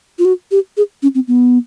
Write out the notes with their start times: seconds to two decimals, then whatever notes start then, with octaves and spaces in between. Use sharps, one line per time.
0.19 F4
0.25 F#4
0.51 G4
0.77 G#4
1.03 C#4
1.15 C4
1.28 B3